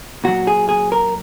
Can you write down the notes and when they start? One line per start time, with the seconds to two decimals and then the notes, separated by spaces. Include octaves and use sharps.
0.24 A#2 F#3 F#4
0.47 G#4
0.69 G#4
0.92 A#4